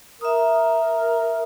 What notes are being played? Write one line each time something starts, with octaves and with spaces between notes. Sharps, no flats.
A#4 E5 D#6